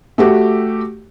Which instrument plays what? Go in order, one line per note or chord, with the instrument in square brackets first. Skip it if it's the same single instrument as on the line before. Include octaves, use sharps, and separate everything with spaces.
[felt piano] A3 F#4 G4